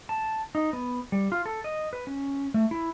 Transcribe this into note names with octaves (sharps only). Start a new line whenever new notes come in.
A5
D#4
B3
G3
F4
A4
D#5
B4
C#4
A3
E4